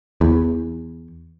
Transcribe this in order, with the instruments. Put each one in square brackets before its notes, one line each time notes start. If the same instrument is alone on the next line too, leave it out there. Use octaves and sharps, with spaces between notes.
[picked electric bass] E2